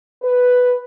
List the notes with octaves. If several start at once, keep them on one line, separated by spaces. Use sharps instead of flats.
B4